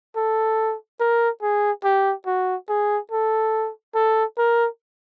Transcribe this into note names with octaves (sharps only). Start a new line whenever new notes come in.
A4
A#4
G#4
G4
F#4
G#4
A4
A4
A#4